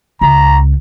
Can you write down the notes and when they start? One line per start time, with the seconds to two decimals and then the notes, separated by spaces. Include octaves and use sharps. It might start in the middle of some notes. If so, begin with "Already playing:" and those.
0.21 C#2 A#5